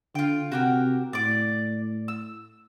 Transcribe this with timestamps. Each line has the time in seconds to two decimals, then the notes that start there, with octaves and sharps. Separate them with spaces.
0.15 D3 F4 G5
0.52 C3 F#4 G4 A#4
1.13 A2 D5 D6
2.08 E6